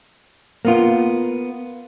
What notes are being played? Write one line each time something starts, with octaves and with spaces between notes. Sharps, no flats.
A#3 B3 F4